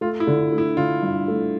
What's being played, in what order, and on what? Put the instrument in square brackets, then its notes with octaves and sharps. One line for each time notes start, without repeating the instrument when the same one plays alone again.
[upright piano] A3 [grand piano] F4
[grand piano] E4
[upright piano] D3
A3
[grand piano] E4
[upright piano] D3 [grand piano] F4
[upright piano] G2
A3